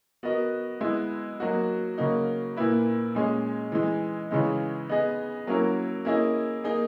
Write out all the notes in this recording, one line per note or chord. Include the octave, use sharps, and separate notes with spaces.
B3 F#4 A#4 D#5
G#3 B3 E4
F#3 A#3 D#4 F#4
C#3 F#3 A#3 D#4
A#2 A#3 E4 B4
A#2 G#3 C#4 G#4
E3 G#3 D#4
C#3 E3 G#3 D#4
B3 D#4 G#4 D#5
F#3 A#3 C#4 E4 A#4
A#3 C#4 E4 G#4 D#5
A#3 D#4 G#4 D#5